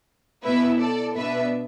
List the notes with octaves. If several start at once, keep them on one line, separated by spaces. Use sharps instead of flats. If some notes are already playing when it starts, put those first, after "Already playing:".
B2 B3 E4 B4 E5
A4 D5
B2 B3 D4 B4 E5